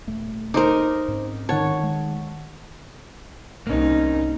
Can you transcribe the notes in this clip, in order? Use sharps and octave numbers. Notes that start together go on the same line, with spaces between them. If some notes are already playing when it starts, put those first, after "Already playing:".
D#1 A3
D#4 A#4 C5 D6
G#2 C4 C#4
D#3 C#5 F#5 A5
G#3
C2 A#3 C#4 D#4